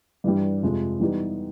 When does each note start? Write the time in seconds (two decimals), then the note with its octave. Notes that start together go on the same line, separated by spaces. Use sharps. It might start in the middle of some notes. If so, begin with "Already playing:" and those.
0.24 G2 E3 G3
0.63 F2 C3 F3 G#3
1.00 E3 G3 B3 D#4 G4